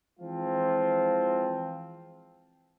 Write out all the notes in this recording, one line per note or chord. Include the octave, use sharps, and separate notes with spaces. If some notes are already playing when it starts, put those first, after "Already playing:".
E3 F3 G#3 C4 F4 A5